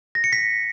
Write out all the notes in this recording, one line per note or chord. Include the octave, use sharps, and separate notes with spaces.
A#6
C#7
B6